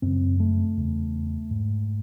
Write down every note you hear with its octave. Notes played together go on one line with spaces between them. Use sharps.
F#2 C#3 C4
A3
E2 C#3
G#2